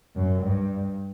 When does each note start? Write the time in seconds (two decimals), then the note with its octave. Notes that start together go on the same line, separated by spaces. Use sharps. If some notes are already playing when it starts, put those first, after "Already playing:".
0.16 F#2
0.43 G2